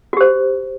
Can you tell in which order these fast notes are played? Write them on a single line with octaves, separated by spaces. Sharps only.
F#4 G4 C5